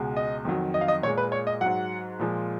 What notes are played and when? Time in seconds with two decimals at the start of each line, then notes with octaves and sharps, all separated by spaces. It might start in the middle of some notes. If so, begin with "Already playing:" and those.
Already playing: C#2 B2 G#3
0.16 D#5
0.45 F2 D#3 F#3
0.74 D#5
0.81 F5
0.88 D#5
1.03 A#2 C#5
1.07 G#3
1.18 B4
1.32 C#5
1.47 D#5
1.61 G#2 F#3 F#5
2.19 A#2 F3 G#3